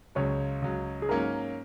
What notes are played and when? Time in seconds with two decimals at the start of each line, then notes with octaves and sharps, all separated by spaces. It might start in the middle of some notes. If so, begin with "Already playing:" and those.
0.15 C#2 C#3 F#3 C#5
0.62 C#2 C#3 F#3
1.02 G#4
1.09 G#2 F#3 A#3 C#4 A#4